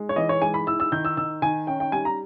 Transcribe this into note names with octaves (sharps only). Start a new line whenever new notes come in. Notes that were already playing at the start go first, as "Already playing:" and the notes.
Already playing: G#3
C#5
E3 D#5
C#5
G#3 G#5
B5
E4 E6
E6
D#3 G6
E6
D#3 E6
D#3 G#5
C#4 G5
G5
G3 G#5
A#5